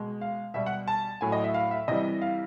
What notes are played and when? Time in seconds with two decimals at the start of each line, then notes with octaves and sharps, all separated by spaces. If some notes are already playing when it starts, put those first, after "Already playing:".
Already playing: B2 G#3
0.21 F5
0.54 B2 G3 E5
0.66 F#5
0.88 A5
1.21 A2 F#3 G#5
1.32 D#5
1.44 E5
1.54 F5
1.71 E5
1.88 C3 E3 G3 D#5
2.21 F5